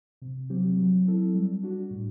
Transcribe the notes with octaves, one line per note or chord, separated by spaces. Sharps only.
C3
F#3 C4 G4
F#3
C4 E4 A4
G3
D4 F#4
A2